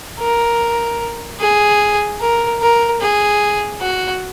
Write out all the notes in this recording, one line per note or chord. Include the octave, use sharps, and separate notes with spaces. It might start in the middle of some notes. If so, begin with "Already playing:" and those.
A#4
G#4
A#4
A#4
G#4
F#4